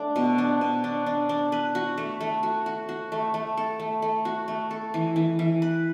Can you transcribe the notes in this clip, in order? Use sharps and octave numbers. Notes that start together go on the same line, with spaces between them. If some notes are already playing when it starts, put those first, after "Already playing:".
Already playing: A3 D4
B2
D4
B2
D4
D4
D4
B4
F#4
A3
A3
F#4
F#4
F#4
A3
A3
A4
A3
A3
F#4
A3
A4
E3
E3
E3
B4